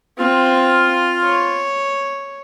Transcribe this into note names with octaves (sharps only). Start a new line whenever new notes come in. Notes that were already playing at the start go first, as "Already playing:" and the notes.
C4 F4
C#5